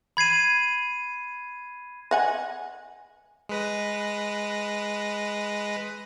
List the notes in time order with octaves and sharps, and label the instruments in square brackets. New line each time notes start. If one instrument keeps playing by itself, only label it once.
[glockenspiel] B5 G#6 C7 D#7
[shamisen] D#5 F#5 G#5
[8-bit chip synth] G#3 B4 A#6